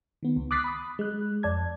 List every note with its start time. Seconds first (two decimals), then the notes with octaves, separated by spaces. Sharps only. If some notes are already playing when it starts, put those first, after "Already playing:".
0.23 D#3 B3
0.36 C#2
0.51 D6 D#6 F#6 A6 B6 C7
0.64 B5 D#6
0.99 G#3 F#6
1.43 F2 D5 A5 G#6